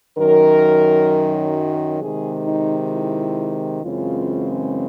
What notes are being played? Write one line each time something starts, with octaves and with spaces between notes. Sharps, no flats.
F#2 D#3 F#3 A#4
C3 D#3 G#3 G#4
D#4
E4
F#2 C#3 E3 G#3 C4 F4